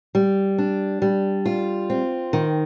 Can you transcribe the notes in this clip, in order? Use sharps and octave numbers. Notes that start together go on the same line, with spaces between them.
G3
D4
G3
F4
C4
D#3